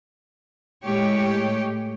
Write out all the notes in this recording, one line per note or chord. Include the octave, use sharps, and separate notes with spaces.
A2 G#3 G4 C#5